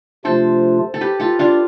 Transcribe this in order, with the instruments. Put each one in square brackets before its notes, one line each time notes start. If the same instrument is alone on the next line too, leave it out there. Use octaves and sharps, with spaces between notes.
[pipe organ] C3 F3 A3 D4 F4 [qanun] A4 C5
[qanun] A4
G4 B4
F4 A4
D4 F4